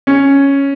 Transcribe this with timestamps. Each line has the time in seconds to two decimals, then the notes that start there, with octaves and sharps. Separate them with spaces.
0.07 C#4